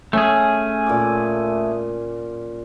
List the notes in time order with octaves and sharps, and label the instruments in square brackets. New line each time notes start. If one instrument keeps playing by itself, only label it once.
[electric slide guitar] A3 G#4 [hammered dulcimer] C#4
[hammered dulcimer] A#2 D6